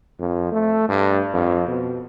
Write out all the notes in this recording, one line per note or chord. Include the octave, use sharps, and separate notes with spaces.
F2
A3
G2
F2
B2